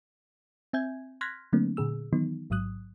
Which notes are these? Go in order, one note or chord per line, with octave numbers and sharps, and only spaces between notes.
C4 E5 G#5 G6 G#6
C6 F6 F#6 G#6 A#6 B6
D3 F#3 A3 A#3 C4 D4
A#2 D3 G#4 E6
D#3 E3 F#3 B3 D#4
A1 G#2 F#3 D#6 F#6